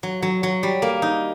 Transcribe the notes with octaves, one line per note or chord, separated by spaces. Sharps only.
F#3
F#3
F#3
G3
A#3
D#4